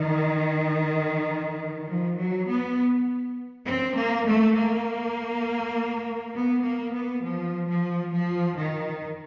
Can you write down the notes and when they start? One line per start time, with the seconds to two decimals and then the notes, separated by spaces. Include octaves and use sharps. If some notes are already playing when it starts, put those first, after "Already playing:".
Already playing: D#3
1.88 F3
2.17 F#3
2.47 B3
3.66 C4
3.96 A#3
4.25 A3
4.55 A#3
6.35 B3
6.63 A#3
6.94 B3
7.23 F3
7.68 F3
8.13 F3
8.57 D#3